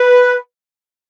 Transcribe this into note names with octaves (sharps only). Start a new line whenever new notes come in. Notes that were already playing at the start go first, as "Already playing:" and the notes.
Already playing: B4